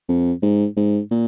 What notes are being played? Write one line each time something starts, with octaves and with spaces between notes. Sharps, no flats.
F2
G#2
G#2
A#2